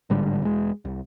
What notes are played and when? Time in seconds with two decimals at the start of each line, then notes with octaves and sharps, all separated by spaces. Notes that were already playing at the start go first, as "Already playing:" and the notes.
0.10 A1 G#2 D3 G3
0.42 E1 G#3
0.85 C2